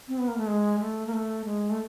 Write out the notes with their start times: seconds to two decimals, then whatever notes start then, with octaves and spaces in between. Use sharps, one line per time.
0.08 C4
0.18 B3
0.28 A#3
0.38 A3
0.47 G#3
0.80 A3
1.07 A#3
1.13 A3
1.45 G#3
1.70 A3